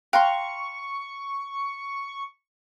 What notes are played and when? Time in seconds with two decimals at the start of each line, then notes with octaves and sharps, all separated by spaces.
0.13 F5 G5 A#5 C6 C#6 F#6